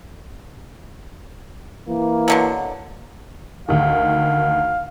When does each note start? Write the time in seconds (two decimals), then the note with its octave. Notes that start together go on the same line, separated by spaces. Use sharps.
1.88 E3 A#3
2.28 B2 D3 F#3
3.68 D2 D#3 F5